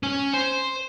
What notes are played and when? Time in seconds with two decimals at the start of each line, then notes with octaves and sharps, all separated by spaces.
0.03 C#4
0.33 C5